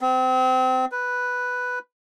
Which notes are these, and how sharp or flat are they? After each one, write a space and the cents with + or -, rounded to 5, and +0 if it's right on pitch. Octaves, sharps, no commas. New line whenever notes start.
C4 -30
B4 +0